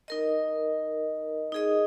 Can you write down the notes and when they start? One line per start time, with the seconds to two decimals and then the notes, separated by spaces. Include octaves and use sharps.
0.08 D#4 A#4 D#5
1.52 D#4 G#4 D#5